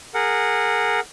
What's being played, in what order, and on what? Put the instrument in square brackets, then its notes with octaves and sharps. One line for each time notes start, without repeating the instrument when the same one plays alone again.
[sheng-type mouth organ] G#4 A#4 F#5